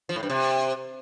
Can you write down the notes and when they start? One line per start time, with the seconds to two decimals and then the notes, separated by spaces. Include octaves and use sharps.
0.09 F3
0.16 A2
0.23 G2
0.30 C3